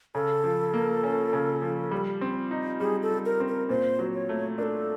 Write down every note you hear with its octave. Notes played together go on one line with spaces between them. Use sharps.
C#3 A4
F3
A#3
C#4
C#3
F3
G3
C4
D#4
G3 G#4
A4
G3
A#4
C4
A#4
A#2 C5
F#3
C#5
A3
D4 A4 A#4